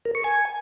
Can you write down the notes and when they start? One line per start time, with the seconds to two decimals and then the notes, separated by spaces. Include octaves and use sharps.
0.05 A#4
0.15 C#6
0.24 G#5